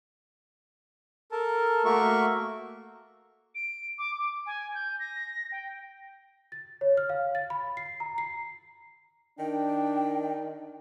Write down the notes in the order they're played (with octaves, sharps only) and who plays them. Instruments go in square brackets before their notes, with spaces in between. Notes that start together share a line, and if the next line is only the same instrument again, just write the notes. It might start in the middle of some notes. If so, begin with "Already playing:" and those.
[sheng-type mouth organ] A4 A#4 A5
A3 A#3 F#4 A#4 E5 C#6
[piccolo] D7
D6
D6
G#5
G6
A#6
G5
[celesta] A6
C#5
F6
F5
A6
B5
C7
A#5
C7
[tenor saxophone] D#3 [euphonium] D4 [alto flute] G5